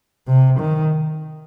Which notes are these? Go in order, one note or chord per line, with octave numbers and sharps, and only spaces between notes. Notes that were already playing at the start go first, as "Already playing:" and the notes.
C3
D#3